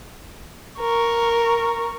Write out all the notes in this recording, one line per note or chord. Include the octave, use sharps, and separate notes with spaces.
A#4 C#6